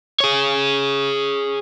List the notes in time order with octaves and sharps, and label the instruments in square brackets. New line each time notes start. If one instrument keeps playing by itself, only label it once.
[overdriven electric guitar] G#4 C#5